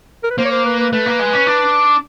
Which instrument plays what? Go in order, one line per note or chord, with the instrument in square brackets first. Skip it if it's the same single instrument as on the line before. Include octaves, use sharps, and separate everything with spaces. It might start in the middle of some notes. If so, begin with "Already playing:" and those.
[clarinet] A#4
B4
[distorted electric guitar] A#3 [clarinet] C5
[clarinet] C#5
C5
B4
B4
[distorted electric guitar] A3 [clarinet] B4
[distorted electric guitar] A#3
G#3
C#4
D4